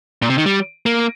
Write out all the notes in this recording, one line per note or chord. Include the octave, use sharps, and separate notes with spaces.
A#2
C3
D#3
G3
A#3